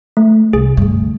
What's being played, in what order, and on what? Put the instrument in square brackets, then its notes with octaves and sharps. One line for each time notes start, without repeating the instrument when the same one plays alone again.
[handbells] A3
[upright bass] C2 [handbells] G#4
[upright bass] D2 G2